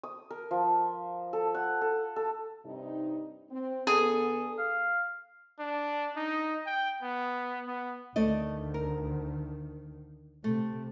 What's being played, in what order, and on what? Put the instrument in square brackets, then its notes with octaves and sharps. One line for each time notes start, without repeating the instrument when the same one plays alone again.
[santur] D#6
A#4
F3
A4
F#5
A4
A4
[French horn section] G2 C3 D#4
C4
[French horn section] D3 B3 A4 [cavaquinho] G#4
[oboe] F5
[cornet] D4
D#4
G5
B3
B3
[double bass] D2 D#3 [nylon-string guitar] A3 D5 D#5
[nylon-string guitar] A#4
[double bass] C3 [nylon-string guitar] A3